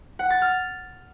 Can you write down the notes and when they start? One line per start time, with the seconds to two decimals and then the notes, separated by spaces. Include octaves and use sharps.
0.19 F#5
0.30 A6
0.42 F6